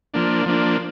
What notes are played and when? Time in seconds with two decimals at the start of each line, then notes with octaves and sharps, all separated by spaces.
0.14 F3 A#3 D4
0.46 F3 A#3 D4